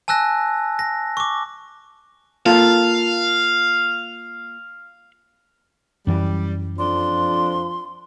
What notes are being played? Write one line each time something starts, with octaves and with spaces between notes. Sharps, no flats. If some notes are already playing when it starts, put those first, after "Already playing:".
G#5 A5 E6 F#6 A#6
A#6
C#6 D6
A#3 F4 A4 F5
F#2 E3 G3
F2 F3 D4 C6